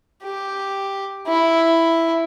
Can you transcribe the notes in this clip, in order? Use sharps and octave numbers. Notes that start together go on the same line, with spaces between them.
G4
E4